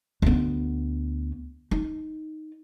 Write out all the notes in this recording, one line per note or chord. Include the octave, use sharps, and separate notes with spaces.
D2 B3
D#4